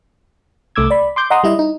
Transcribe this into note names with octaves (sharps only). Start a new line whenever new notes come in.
C2 A3 D6 E6 G#6
D5 B5
C6 D6 G6
D#5 F#5 A#5 C6 D#6
G3 E4 D#5
D#4